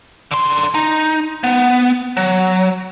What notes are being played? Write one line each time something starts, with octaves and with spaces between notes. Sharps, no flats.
D3 C6
D#4
B3
F#3